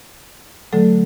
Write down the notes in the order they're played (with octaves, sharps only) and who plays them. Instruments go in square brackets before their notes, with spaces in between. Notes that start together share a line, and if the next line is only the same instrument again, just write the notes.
[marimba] D3 F#3 A3 A4